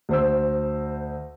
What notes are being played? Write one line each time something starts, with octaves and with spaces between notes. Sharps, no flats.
D2 C5 E6